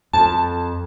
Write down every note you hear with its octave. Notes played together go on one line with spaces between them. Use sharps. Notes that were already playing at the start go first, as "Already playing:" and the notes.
F2 A5